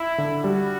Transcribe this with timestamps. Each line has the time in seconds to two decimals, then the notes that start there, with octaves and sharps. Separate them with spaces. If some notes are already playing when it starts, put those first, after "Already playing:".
Already playing: E4
0.18 D3
0.44 G3 F#4